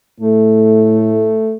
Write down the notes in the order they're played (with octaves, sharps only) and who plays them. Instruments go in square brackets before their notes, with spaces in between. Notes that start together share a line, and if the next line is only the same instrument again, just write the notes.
[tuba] A2 [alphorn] A3